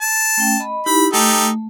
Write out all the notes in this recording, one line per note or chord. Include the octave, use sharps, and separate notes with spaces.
A5
A3 C#4 G5
D#5 B5
D#4 E4 G4 B5
A3 D#4 G4 A4